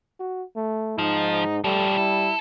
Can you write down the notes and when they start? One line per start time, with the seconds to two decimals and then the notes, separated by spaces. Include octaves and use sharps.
0.20 F#4
0.56 A3
0.99 G#2 F3 D#4
1.64 A2 F3 G3 A3
1.97 E4 A4